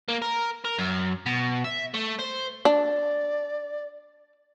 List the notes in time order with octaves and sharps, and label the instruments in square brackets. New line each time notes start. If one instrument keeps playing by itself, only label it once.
[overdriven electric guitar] A#3
A#4
A#4
F#2
B2
E5
A3
C5
[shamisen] D4 [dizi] D5